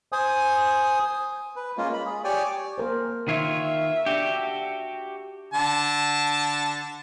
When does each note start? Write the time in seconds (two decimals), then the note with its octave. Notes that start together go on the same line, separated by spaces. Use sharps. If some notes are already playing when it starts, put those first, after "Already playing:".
0.12 C5 G#5 D#6
1.56 B4
1.78 G#3 A#3 C#4 F4
1.93 B5
2.06 G#4
2.24 G4 C#5 D5 G5 G#5
2.43 D6
2.78 A#3 A#4 C5
3.28 D#3 F4 C#5 E5
4.06 D4 F#4 G4
5.54 D3 A5